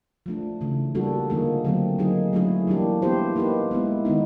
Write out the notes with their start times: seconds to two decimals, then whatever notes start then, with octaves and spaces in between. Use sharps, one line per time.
0.26 F3 A3 D4
0.61 C#3 E3 A3
0.95 G3 A#3 D4 F#4 A4
1.30 D3 F3 A#3 D#4 G#4
1.65 D3 F#3 A3 C4
1.99 F#3 A#3 D#4 G#4
2.33 F#3 A3 C#4 E4 G#4
2.67 E3 G3 A#3 D4 G4
3.02 B3 E4 G4 C5
3.36 A#3 D#4 G4 B4
3.71 G#3 B3 E4
4.05 D#3 G#3 B3 D#4